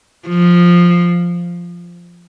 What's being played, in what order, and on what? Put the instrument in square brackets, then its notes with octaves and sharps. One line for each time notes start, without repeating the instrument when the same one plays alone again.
[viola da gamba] F3